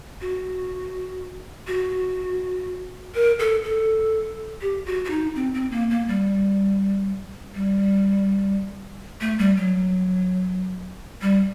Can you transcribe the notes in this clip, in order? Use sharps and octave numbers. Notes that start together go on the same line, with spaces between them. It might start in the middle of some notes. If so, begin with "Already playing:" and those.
F#4
F#4
A#4
A4
A4
G4
F#4
F#4
D#4
C4
C4
A#3
A#3
G3
G3
A3
G3
F#3
G3